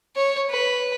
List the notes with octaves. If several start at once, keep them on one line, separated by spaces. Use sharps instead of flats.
C#5
B4